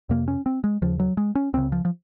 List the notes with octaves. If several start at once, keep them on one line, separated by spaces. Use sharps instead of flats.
F2 C3 A#3
C#4
C4
G#3
D#2 C#3 F3
F#3
G#3
C#4
C#2 C#3 C4
F3
F3